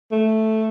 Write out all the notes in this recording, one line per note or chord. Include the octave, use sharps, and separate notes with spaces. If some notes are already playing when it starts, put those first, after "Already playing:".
A3